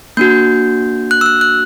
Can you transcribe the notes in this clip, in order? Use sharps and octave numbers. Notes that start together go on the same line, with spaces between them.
A#3 D4 F#4 G6
F#6
E6
F#6
F#6